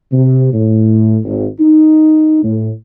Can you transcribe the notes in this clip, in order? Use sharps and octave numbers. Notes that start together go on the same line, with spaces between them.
C3
A2
G#1
D#4
A2